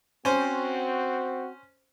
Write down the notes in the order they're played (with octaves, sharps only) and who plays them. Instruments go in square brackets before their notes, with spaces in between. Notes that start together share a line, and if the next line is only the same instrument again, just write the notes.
[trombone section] C4 F#4 [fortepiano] C#4 C5